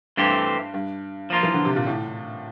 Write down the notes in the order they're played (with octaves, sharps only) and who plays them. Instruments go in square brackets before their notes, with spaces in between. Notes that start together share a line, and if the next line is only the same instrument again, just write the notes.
[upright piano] G2 [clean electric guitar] E3 A3 C4 G4
[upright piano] G2
[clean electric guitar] F3 A#3 F4
[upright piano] E3
D3
C3
A#2
A2